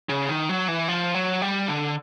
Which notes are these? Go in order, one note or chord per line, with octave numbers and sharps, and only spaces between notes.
C#3
D#3
F#3
E3
F3
F#3
G3
D3